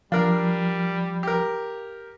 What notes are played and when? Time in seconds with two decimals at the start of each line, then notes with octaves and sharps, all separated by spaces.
0.12 F3 G3 D4 A#4 F5
1.23 G4 A#4